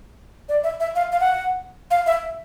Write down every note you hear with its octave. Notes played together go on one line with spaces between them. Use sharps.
D5
E5
E5
F5
F5
F#5
F5
E5